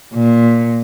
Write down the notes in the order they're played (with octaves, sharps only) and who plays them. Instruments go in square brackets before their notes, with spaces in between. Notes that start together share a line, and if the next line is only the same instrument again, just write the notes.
[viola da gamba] A#2